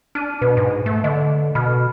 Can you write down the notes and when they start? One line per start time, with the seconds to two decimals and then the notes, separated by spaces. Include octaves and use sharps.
0.15 D4 F6 D#7
0.42 B2 B4
0.57 G#2
0.86 A3
1.04 D3 D#5
1.55 B2 B5 F6